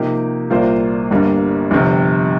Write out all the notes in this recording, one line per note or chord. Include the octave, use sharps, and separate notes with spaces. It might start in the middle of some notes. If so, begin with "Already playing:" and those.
Already playing: C3 F3 A#3 D#4 G4
C2 A#2 A#3 F4 C5
G1 G2 G3 A#3
G1 F2 C3